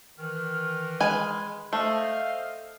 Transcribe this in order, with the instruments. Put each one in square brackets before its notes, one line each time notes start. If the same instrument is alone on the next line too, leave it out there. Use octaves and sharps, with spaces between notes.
[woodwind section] D#3 E3 F6
[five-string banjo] G#3 B4 G#5
[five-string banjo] A3 [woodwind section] C5 D#5 F5